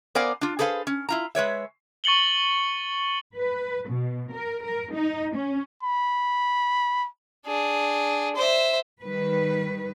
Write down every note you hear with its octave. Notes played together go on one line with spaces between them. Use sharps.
B3 A#4 C5 D5 F5 G#5
D4 F4
G#4 A4 B4 C5 F5
C#4
E4 F4 A#5
G#3 B4 C#5 E5
C#6 A6 C#7 F#7 G7
B4
B2
A#4
A#4
D#4
C#4
B5
D4 G#4
C5 E5
D#3 G3 B4